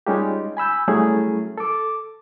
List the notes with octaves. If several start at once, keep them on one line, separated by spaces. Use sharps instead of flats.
G3 G#3 C#4 D#4 F4 G4
G#5 B5 E6 G6
F#3 G3 A3 C#4 E4 G#4
A4 D6